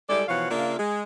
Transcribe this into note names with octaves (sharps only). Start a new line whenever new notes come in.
G3 G#3 E4 A4 D5
B2 E3 F3 C#5 F5 F#5
C#3 A#3 D4 F4 E5 F5
G#3